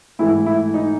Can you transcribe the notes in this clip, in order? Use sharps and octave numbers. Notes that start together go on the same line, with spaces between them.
G#2 E3 A3 E4
E4
D#4